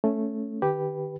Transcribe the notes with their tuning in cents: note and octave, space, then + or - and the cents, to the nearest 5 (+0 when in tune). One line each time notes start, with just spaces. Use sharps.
A3 +0 C#4 +0
D#3 -45 G4 +0 B4 -5